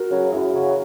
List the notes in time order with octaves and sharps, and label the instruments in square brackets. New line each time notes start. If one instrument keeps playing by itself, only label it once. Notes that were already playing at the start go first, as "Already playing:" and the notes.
Already playing: [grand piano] F#4 A#4
[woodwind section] C#3 F#3
[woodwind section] F#2 [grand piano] E4 G#4
[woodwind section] C#3 F#3